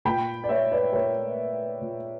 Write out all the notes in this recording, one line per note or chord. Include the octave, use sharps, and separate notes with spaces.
A#2 G5 B5
D5
C#5 E5
B4 D5
A#2 A#4 C#5
A#2